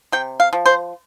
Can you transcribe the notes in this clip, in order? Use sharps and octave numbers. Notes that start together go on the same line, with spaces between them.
C3 G5
F5
F3
C5